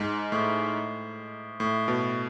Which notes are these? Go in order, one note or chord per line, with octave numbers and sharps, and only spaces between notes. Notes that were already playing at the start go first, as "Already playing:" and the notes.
Already playing: G#2
A2
A2
B2